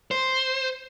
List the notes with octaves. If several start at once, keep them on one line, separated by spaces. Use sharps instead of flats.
C5